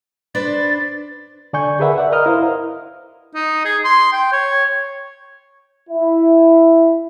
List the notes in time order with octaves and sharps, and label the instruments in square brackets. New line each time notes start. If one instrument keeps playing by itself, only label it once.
[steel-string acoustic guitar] D4 B4 C5 [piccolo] A6
[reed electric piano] D3 D5 G#5 C#6 G6
G#4 A#4 B4 E5 F#5
D5 E5 F#5
A#4 B4 D#5 A#5 D#6 F6
E4 A#4 C5 F5
[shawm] D#4
G#4
C6
G5
C#5
[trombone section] E4